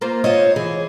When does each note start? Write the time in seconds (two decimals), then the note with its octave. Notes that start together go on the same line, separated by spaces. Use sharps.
0.01 A#3 F4 C5
0.24 F4 C5 C#5 D#5
0.56 E3 G#4